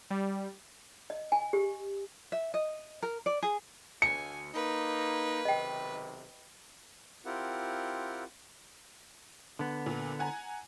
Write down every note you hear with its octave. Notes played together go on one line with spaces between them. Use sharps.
G3
D#5
G#5
G4
E5
D#5
A#4
D5
G#4
D2 G#5 C#7
A#3 D#4 B4
B1 C3 D#3 D#5 G5
C4 E4 F4 G4 A#4 F#5
D3 B3
A#2
F#5 G#5 A#5